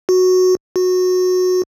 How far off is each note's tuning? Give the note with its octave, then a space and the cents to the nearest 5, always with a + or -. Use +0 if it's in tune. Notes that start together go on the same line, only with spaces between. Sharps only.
F#4 -5
F#4 -15